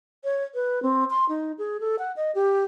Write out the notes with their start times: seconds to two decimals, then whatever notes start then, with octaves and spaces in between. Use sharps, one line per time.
0.24 C#5
0.55 B4
0.83 C4
1.10 C6
1.29 D#4
1.58 G#4
1.80 A4
1.99 F#5
2.16 D#5
2.35 G4